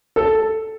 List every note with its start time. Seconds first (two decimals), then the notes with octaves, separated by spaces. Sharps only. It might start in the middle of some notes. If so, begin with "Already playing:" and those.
0.16 A4